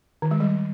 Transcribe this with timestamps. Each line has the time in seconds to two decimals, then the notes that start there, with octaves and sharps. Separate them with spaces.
0.22 D#3
0.31 G#3
0.40 G3